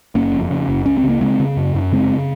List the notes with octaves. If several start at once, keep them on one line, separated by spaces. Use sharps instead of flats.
F#1 A#3 C#4
F2
C#3
F#1
C#2 C#4
C4
C#3
A#3
C#3 G#3 C4
C#3
F#2
F#2
C#3 G#3 C4